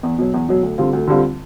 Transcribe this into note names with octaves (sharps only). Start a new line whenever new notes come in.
E2
B2 F#3
E2
B2 F#3
D2
D3 G3 C4 F4
D2
D3 G3 C4 F4